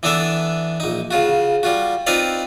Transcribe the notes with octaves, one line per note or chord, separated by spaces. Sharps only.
E3 B3 D4 A4 D5 E5
A#1 D#4
C#3 F4 F#4
G3 F4 F#4
C4 D#4 F4 B4 D5 F5